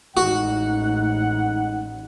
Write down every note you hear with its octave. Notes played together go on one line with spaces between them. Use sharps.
A1 G#2 D#4 F#4 F#5